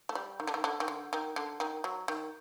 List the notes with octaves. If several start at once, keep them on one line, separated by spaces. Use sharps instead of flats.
A3
G3
D#3
D3
D#3
D3
D#3
D3
D#3
D3
D#3
F#3
D#3